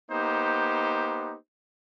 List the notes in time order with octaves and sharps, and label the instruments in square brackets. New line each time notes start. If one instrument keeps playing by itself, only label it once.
[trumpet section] A#3 B3 D#4 G4 C5